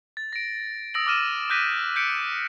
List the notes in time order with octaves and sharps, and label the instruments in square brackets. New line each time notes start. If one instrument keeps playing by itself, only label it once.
[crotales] A6
A#6 D7
D#6 E6 A#6 D7 F#7
D6 E6 F6 D#7 E7
D6 F#6 G6 A#6 B6 D#7
G6 B6 C#7 D7